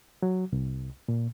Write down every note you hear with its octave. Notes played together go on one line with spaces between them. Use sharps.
F#3
C2
A#2